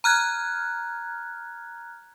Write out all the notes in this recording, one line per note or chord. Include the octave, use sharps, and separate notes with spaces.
A#5 F6 F#6 G#6